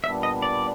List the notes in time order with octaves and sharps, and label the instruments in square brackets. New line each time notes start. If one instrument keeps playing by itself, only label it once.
[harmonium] A#2 G3 B3 D4 [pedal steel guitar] E5
[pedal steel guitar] D#5
D5